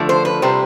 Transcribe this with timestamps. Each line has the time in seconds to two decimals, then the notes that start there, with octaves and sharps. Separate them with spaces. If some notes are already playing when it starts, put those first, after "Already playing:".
Already playing: D3 F3 A3
0.09 C5
0.25 B4
0.42 C3 G3 C5